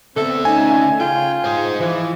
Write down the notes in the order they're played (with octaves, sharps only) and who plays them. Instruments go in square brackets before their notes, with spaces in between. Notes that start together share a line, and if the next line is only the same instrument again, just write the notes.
[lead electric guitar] D3 E5 [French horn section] B3 C4 [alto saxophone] A4
[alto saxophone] A3 [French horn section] C#4 D#4 [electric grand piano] G#5
[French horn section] C#3 [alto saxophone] F4 [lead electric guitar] G5
[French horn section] G#2 [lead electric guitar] G#4 C5
[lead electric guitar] E3 [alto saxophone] F3